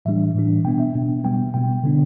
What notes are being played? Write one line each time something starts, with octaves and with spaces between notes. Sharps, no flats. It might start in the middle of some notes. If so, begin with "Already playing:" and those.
A2 E3 G3 D4 E5
A2 E3 G3 D4
B2 B3 D4 G5
E5
B2 B3 D4
B2 G3 B3 G5
B2 G3 B3 G5
D3 B3 D4